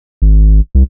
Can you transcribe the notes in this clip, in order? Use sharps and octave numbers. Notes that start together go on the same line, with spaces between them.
G#1
C2